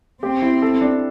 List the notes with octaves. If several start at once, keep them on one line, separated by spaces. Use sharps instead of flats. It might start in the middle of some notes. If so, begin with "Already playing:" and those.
C4 G4
E4
A4
D4